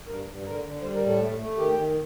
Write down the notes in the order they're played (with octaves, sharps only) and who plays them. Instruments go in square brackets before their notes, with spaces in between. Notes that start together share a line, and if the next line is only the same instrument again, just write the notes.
[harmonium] G2 A#4
G2
D3 A#4
D3
G3 C5
A#4
A2
A4
A3
A3
D#3 G4
D#3